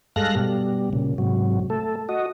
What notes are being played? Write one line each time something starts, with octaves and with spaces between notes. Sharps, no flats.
G2 G#3 A4 F5 F#6 A#6
B2 G3
A#2 C#3
G#2 C3 F#3
A3 A4
F#4 D#5